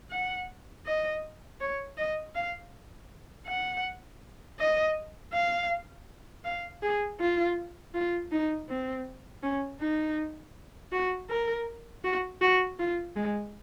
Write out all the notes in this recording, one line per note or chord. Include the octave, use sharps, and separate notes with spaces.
F#5
D#5
C#5
D#5
F5
F#5
D#5
F5
F5
G#4
F4
F4
D#4
C4
C#4
D#4
F#4
A#4
F#4
F#4
F4
G#3